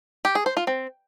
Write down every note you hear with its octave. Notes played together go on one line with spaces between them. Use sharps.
G4
G#4
C5
F4
C4